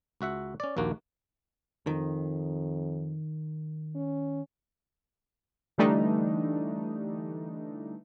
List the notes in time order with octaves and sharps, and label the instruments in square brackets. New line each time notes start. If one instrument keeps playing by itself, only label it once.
[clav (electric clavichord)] C#2 F#4 E5 F#5
C#4 D5
A#1 D#2 A#3 F#4
[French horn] F2 [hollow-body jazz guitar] D#3
[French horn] C#4
[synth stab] D3 E3 G3 A3 D4 D#4